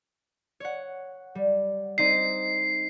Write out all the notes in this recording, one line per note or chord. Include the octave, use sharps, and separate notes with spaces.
C#5 F#5
G3
C4 D#4 D#5 C7